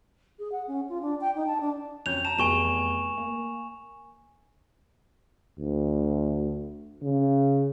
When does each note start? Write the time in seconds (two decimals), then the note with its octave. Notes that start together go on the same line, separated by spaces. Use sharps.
0.39 G#4
0.52 F#5
0.68 C#4
0.89 F4
1.02 D4
1.21 G5
1.36 D#4
1.47 A5
1.60 D4
2.06 F2 C#4 G6 F7
2.25 A5 A#5 E7
2.39 F1 E2 G#4 G#5 C#6 E7
3.17 A#3
5.58 D2
7.02 C#3